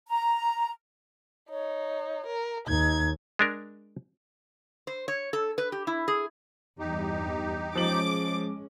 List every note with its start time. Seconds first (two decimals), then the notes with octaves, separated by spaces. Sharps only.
0.09 A#5
1.50 D#4 C#5
2.27 A#4
2.68 D#2 D#4 G#6
3.39 G#3 D4 A#4
4.87 C5
5.08 C#5
5.33 A4
5.58 B4
5.72 G4
5.87 E4
6.08 G#4
6.79 E2 G2 D#4 G4
7.75 F3 G#3 C#4 D6 F#7